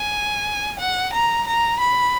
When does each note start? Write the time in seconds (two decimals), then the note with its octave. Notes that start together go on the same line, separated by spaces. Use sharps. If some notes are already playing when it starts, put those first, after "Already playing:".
Already playing: G#5
0.79 F#5
1.13 A#5
1.47 A#5
1.80 B5